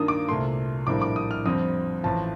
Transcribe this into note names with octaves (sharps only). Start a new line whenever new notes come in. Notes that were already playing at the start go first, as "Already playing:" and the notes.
Already playing: G2 D#3 A#3 D4 F4 D#6
D6
C2 A#2 A3 C6
A#1 A2 G3 A#3 D4 D6
D6
D#6
F6
F2 D3 G3 C4 D#6
A1 A2 F3 A5